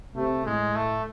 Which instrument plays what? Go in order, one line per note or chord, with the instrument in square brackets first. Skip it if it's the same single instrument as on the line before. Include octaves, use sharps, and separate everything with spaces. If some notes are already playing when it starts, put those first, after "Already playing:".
[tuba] C3 [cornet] A3
[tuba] A2 [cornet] G#3
[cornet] A3